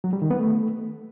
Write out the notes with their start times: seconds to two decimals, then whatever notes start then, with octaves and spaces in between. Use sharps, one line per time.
0.04 F#3
0.13 G3
0.22 D#3
0.31 B3
0.39 A3